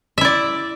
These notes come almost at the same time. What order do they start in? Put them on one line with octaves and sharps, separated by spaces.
E5 E4 D5